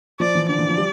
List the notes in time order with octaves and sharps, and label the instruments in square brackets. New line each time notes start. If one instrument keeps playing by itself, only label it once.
[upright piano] F3 [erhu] D5
[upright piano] E3
[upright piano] D3 [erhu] D5
[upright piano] E3
F3
G3